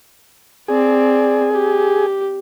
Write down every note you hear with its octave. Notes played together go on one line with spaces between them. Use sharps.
C4 G#4 D5
G4